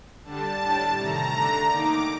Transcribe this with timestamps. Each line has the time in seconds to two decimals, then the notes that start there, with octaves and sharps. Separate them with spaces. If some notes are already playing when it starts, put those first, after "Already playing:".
0.24 D3 G3 D4 A5
0.60 A2 G3 D4
0.96 C3 D#3 A3 A#5
1.33 D3 A3 D4
1.69 D#3 A#3 D#4 D6